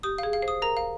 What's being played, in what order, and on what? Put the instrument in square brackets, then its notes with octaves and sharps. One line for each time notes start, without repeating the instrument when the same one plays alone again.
[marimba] G4 [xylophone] D#6
[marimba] G#4 [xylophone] F5
[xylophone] F5
[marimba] C5
[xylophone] D#6
[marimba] A#4 [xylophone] A#5
[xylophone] F5